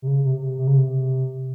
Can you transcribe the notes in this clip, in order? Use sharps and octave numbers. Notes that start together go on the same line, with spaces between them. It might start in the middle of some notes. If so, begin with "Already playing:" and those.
C3
C#3
C3
C3
C3
C#3
C3